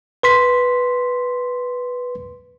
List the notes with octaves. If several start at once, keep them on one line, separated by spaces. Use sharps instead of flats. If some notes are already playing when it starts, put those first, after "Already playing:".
B4 C6 B6